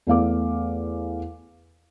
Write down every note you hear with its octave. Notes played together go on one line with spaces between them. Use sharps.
E2 A3 F5 D6